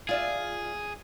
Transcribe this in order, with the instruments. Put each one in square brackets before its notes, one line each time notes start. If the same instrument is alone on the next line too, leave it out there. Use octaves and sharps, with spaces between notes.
[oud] F4 D5 E5 [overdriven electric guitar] G#4